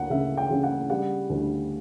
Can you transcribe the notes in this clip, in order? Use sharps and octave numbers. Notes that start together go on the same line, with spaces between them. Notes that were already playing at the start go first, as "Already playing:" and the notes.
Already playing: D2 A#3 F#5
C#3 E5
G5
C#3
F#5
G3 F#5
D2